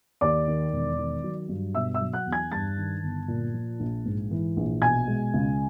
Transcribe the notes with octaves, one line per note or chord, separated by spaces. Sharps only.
D#2 D5 D6
D#3
E1
D#3
F#3
G2
B2 E5 E6
E5 E6
F#3
F#5 F#6
E2
G#5 G#6
G2 A5 A6
D#3
G1
A#2
F3
A#1
G#2
E3
A#1
B2 G#5 G#6
G#3
C#2